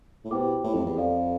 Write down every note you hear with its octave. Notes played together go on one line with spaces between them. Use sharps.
A2
B2 E4 G4 C5 G5 D6
A2
F2
E2
F2 A4 D5 F5